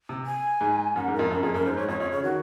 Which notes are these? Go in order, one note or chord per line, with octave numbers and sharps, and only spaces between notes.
C3
G#5
G#2
F#2 F#5
G#2
A#4
F2
F#2 A#4
F2 G#4
F#2 A#4
G#2 C5
G#2 C#5
F2 C#5
F2 C#5
C#3 C#5
D#3 F#4